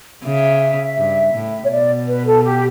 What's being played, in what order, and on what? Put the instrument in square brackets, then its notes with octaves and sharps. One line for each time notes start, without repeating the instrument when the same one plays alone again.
[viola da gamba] C#3 [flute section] E5
[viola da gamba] G2
A2
[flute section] C#5
[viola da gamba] B2 [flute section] D5
[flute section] B4
A4
G4